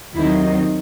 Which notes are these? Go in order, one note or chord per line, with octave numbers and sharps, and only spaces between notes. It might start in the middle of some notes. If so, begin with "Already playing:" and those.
D#2 D#3 F#3 C4 E4
D#4